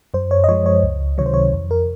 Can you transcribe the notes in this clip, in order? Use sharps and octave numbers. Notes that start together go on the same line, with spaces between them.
F#2 C5
C#5
D#5
F3 G#3 C#5
C#5
C#2
C3 D#3 F#3 C#5
C5
C#5
F2
A#4